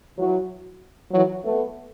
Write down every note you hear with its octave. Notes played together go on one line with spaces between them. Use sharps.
E3 F#3
E3 F#3
A3 B3